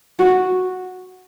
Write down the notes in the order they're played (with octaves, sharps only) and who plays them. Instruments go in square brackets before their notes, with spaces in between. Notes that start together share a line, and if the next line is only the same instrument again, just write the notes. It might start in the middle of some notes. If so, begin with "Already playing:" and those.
[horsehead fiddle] F#4